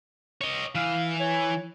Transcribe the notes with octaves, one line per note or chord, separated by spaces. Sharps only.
C#5 D#5
E3 F5
C#5